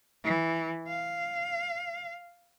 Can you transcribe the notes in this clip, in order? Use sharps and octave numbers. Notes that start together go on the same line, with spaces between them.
E3
F5